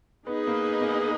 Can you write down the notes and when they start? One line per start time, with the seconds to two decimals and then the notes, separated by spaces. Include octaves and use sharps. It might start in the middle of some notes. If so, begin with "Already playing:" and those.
0.27 B3 D#4 G#4 B4 D#5
0.47 A#3
0.81 A#3
0.89 B3